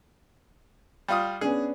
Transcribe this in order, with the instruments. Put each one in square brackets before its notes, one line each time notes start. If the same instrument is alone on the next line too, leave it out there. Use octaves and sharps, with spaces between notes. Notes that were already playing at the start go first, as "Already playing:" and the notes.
[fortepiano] G3 F4 D#6
[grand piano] B3 C#4 D4 [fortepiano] G#4